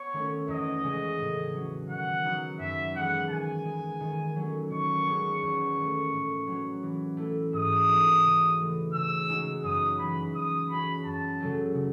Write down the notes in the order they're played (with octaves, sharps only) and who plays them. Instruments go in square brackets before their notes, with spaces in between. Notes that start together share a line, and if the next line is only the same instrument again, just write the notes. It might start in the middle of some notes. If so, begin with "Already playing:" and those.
Already playing: [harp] B3 [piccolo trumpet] C#5
[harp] D#3 A3 C#4
[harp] E2 [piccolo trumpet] D#5
[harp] C#3 G#3 C#4
A2
F#3 C#4 F#4
[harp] D#3 [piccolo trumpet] F#5
[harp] F#3 B3 D#4
[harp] F#2 [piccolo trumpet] E5
[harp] E3 G#3 [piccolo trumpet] F#5
[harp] D#3 [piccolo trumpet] G#5
[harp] G#3 B3
D#3
F#3 A3 C#4
[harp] D#3 [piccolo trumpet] C#6
[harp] G#3 C#4
E2
D#3 A3
A2
F#3 C#4 F#4
E3
A3 E4
[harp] G#2 [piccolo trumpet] D#6
[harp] E3 A3 D#4 F#4
C#3
E3 A3
[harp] C#3 [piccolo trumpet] E6
[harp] G#3 D#4 F#4
[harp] F#2 [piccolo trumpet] D#6
[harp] E3 G#3 C#4 [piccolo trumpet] B5
[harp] E3 [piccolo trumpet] D#6
[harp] G#3 C#4 F#4 [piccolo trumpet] B5
[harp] F#2 [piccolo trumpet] A5
[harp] C#3 F#3 A3
C#3